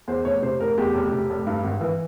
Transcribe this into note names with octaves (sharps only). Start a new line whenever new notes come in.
E2 C5
F1 C#5
C3 C5
F1 A#4
E2 G4
F1
C3
F1
G2
G#1
E3